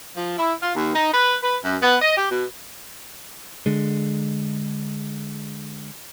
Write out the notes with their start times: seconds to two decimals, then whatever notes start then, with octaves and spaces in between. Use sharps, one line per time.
0.16 F3
0.38 E4
0.61 F4
0.75 D#2
0.95 D#4
1.12 B4
1.43 B4
1.62 F#2
1.81 B3
2.02 D#5
2.16 G4
2.30 B2
3.66 D3 G#3